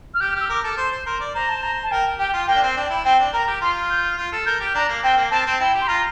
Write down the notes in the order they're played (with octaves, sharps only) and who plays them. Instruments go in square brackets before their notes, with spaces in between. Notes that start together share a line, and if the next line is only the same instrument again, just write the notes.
[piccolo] F6
[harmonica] G4 [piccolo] G6
[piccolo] F6
[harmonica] G4 [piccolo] E6
[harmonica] A#4 [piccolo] D6
[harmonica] A4
[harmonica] C5 [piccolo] C6
[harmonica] C5
[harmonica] A#4 [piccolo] C6
[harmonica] D5
[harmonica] C5 [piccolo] A#5
[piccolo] A5
A#5
A5
[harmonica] A#4 [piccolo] G5
[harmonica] G4 [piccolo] G5
[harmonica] F4
[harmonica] A#3 [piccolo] G5
[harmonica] D4
C4
[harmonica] D4 [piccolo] G5
[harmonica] E4
[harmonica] C4 [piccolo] G5
[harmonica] D4
[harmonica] A#4 [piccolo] A#5
[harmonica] G4
[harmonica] F4 [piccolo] C6
[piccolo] G6
[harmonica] F4
A4
[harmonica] A#4 [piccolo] G6
[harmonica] G4
[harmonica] D4 [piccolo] A#5
[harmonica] A#3
[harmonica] C4 [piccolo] G5
[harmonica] A#3
[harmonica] C4 [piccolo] A5
[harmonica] C4
[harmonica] E4 [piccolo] G5
[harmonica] G4
[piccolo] C6
[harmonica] F4 [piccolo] A#5